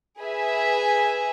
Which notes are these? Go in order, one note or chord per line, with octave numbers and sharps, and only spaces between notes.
G#4 B4 E5 G#5